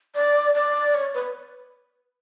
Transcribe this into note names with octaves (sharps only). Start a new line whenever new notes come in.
D5
D5
C#5
B4